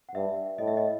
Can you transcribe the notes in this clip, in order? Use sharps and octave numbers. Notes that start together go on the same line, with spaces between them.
F#5
G2 E5
A2 D#5
E5
D#5